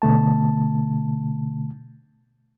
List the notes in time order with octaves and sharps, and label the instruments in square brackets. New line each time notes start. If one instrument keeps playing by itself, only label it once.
[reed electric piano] B2 D3 A3 A5